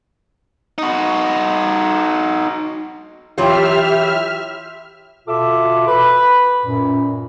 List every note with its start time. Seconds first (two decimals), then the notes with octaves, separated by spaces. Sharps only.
0.78 D#4 F#4
3.38 E3 F#3 F4 G4 C#5 E5 G5 F6
5.28 B2 F4 A4 E5 D6
5.88 B4 B5
6.65 F#2 A#2